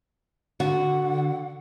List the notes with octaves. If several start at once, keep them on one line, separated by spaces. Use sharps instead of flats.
D3 F#4 F#5